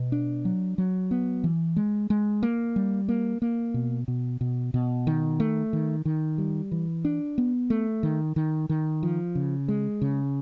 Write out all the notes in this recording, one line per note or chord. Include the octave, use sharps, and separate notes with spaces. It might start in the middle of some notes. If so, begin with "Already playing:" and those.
Already playing: B2
D4
F#3
F#3
B3
E3
G#3
G#3
A#3
G3
A#3
A#3
B2
B2
B2
B2
D#3
A3
D#3
D#3
G3
E3
D4
B3
A3
D#3
D#3
D#3
F3
C#3
G#3
C#3